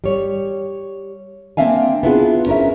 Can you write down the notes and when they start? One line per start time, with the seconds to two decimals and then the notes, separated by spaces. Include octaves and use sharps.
0.04 G3 C#5
1.57 A#3 C4 D4 E5 F5 G#5
2.03 B3 D4 E4 F4 G#4
2.47 C#4 A#4 E5